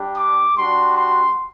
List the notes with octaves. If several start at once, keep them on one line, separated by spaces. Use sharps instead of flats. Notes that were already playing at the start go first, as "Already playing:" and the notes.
Already playing: G3 D4 G4
D6
G3 D4 F#4 C6
C6